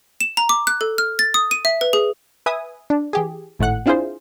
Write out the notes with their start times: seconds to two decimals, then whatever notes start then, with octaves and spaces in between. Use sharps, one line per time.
0.21 E7
0.37 A#5
0.49 D6
0.67 F#6
0.81 A4
0.98 F6
1.19 A6
1.34 D#6
1.51 D#7
1.65 E5
1.81 B4
1.93 G#4
2.46 B4 E5 G#5 D#6
2.90 D4
3.13 E3 G4 G#4
3.59 G#1 A2 A3 F#5 F#6
3.86 C4 D4 E4 F4 G#4 C5